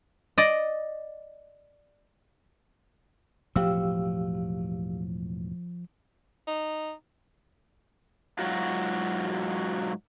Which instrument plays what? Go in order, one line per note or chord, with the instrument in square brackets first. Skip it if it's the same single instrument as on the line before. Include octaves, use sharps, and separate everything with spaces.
[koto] D5 D#5
[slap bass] E1 A2 F#3 [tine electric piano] F3 [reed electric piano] G4 F5 E6
[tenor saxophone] D#4
[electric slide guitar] G#2 F#3 F4 F#4